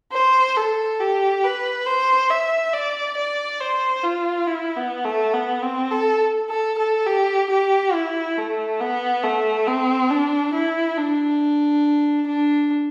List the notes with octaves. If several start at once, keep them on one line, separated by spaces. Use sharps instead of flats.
C5
A4
G4
B4
C5
E5
D5
D5
C5
F4
E4
B3
A3
B3
C4
A4
A4
A4
G4
G4
E4
A3
B3
A3
C4
D4
E4
D4
D4